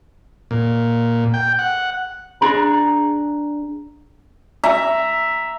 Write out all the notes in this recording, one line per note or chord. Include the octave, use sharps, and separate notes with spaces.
A#2
G5
F#5
D4 G#4 A#5
E5 A#5